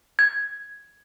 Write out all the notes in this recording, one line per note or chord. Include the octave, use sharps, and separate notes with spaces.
G#6